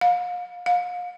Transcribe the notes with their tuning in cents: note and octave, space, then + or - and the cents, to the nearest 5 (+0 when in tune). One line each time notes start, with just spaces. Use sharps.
F5 +35
F5 +35